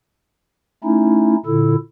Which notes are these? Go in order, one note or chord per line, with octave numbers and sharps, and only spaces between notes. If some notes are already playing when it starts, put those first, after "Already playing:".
A3 C#4 D#4 E4
A#2 D3 E4 A4